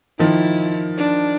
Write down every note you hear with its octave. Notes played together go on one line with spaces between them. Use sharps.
D#3 F3 E4
D4